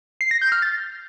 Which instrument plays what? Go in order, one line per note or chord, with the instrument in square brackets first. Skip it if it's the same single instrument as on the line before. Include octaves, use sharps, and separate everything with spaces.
[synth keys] C7
A#6
G6
F6
A6